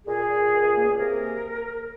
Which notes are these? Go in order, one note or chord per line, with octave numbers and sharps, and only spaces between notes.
A#2 G#4
A#2
C#2
A#3
C3 A#4